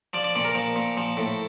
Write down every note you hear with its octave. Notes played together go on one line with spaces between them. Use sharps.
F3 D5
D5
A#2 D5
A#4
F3
A#2
F3
A2